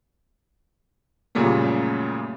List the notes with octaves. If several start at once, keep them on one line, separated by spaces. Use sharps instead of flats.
F#2 A#2 C#3 G3 A3 A#3